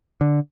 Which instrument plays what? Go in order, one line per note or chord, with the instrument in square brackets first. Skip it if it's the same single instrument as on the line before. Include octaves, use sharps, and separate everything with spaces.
[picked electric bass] D3